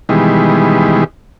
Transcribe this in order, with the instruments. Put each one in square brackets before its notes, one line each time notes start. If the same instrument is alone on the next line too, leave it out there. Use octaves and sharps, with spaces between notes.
[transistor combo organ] B2 D#3 E3 G3 G#3